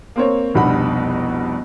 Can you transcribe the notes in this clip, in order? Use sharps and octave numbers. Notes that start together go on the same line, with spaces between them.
A#3 C4 C#5
F1 C2 B2 D4 F#5 B5